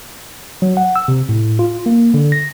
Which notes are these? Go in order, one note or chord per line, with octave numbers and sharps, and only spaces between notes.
F#3
F#5
E6
C3
A2
F4
A#3
D3
A#6